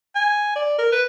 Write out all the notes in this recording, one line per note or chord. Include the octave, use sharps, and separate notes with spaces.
G#5
D5
A#4
B4